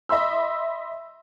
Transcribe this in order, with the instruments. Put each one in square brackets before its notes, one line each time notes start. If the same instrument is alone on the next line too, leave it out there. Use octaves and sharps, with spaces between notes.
[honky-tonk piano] D#5 E5 B5 C6 E6